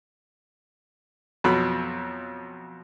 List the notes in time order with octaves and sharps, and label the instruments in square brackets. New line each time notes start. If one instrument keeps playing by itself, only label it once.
[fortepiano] F2 B2 F#3 B5